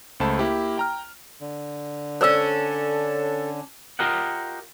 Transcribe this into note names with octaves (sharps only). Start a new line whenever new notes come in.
C#2 A3 C5 A5 B5
A#3 E4 G4
G5 A#5 F6
D3
C#4 D4 A4 C5 D5 E6
F4 G4 A#4 D#5 F#5